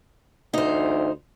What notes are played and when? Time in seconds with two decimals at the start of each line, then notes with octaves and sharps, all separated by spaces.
0.54 D2 D#4 C5